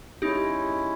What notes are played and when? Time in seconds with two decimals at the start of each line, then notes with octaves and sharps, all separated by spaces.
0.22 G#3 C#4 D#4 E4 G4